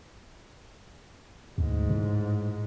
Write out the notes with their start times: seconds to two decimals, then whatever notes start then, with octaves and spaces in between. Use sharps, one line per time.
1.58 D2 G#2
1.90 A2